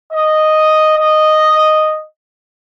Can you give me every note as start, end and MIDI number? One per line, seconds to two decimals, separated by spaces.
0.13 0.94 75
0.99 2.04 75